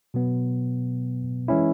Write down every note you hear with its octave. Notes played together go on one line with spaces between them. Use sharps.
B2 F#3 B3
E3 G#3 C#4 E4